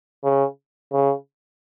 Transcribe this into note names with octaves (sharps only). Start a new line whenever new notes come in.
C#3
C#3